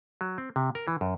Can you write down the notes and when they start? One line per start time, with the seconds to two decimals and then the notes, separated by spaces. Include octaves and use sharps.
0.21 F#3
0.38 C4
0.56 C3
0.75 A#4
0.88 E3
1.01 F#2